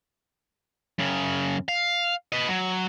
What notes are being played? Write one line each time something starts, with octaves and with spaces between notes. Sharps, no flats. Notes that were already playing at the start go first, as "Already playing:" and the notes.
F#2 C#3
F5
B4 D#5
F#3